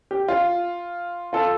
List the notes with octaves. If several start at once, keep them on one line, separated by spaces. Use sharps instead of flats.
G4
F4
F4 A4